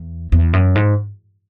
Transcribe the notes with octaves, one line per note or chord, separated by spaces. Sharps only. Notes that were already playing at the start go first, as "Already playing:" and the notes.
Already playing: E2
E2
F#2
G#2